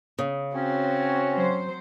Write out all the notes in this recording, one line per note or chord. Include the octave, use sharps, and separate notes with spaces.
C#3
C4 C#4 F#4
F#3 C5